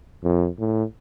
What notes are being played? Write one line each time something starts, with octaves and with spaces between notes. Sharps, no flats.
F2
A2